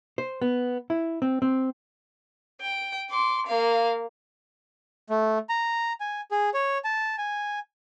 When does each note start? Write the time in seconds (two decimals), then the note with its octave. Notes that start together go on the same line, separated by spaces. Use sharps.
0.18 C5
0.42 B3
0.90 E4
1.22 C4
1.42 C4
2.61 G5
3.10 C6 D6
3.46 A#3 F5
5.10 A3
5.49 A#5
6.00 G#5
6.31 G#4
6.54 C#5
6.85 A5
7.18 G#5